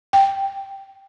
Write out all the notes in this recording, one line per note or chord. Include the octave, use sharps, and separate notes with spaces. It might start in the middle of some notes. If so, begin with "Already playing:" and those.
G5